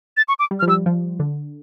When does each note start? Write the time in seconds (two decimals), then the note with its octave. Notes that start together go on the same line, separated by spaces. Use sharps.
0.17 A6
0.28 C#6
0.39 D6
0.51 G3
0.60 F6
0.62 F3
0.68 G3 E6
0.86 F3
1.20 D3